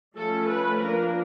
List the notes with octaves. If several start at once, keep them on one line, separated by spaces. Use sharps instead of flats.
F3 A3 C#4 A4
B4
F3 A#3 D4 A#4